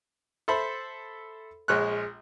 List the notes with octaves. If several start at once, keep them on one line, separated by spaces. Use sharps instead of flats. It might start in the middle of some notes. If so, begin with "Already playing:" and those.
A4 C5 E5 B5
A#1 G#3 C#5 F6 F#6